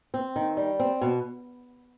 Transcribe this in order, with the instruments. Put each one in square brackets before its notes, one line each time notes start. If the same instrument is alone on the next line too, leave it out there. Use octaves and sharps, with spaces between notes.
[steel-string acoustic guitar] C4
D#3
G3
C4
B2